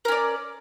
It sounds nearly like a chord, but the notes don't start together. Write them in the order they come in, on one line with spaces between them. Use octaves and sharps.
A#4 C#4 D5